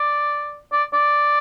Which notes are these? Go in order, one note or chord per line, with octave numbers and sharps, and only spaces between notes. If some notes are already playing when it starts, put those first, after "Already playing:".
Already playing: D5
D5
D5